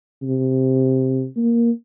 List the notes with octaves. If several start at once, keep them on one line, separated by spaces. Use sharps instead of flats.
C3
A#3